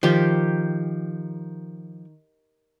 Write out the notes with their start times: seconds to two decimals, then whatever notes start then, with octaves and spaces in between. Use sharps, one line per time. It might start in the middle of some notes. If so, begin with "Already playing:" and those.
0.03 D#3 F3 G4